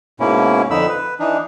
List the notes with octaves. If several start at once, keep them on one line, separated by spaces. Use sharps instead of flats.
G#2 B2 A#3 C#4 E4
F2 D3 D#4 B5 E6
B4
E3 D4 D#4